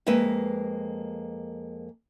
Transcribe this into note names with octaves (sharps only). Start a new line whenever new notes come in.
F2 G#3 A#3 B4 E5